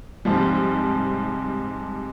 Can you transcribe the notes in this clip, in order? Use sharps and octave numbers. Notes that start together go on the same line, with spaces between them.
G#2 C3 F3 G3